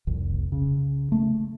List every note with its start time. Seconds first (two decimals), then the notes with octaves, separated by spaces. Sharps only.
0.07 F1 C2
0.52 C#3
1.12 A3